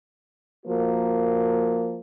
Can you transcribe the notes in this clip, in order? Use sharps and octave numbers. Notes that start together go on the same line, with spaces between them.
F3 A#3 F#4 A#4